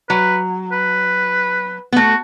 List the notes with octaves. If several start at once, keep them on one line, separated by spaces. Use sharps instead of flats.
F#3 B4
B4
B3
A3 F#4